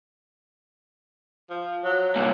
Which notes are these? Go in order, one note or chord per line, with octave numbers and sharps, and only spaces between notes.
F3
F#3
C2 A#2